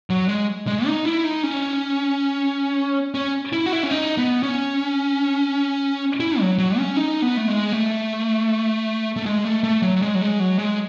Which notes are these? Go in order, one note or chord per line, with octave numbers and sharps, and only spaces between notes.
F#3
G#3
G#3
D#4
E4
D#4
C#4
C#4
E4
F#4
E4
C#4
D#4
B3
C#4
E4
F#3
F#3
C#4
D#4
B3
A3
G#3
A3
A3
G#3
A3
A3
F#3
F#3
G#3
F#3
G#3
F#3
G#3